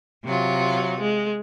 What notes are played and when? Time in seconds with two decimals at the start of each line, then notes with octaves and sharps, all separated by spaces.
0.24 C3 F#3 F4
0.99 G#3